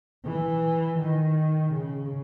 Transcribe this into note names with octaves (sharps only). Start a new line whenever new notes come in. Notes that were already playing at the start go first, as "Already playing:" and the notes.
E3
D#3
C#3